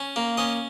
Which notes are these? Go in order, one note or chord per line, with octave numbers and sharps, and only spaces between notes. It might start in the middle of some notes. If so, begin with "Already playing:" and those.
Already playing: C#4
A#3
C#4 D#5